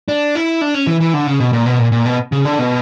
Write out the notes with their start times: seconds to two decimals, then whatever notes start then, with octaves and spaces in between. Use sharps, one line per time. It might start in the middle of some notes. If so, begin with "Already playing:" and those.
0.08 D4
0.35 E4
0.61 D4
0.74 C#4
0.87 E3
1.00 E3
1.14 D3
1.27 C#3
1.40 B2
1.53 A#2
1.66 B2
1.79 A#2
1.92 A#2
2.06 B2
2.32 C#3
2.45 D3
2.59 B2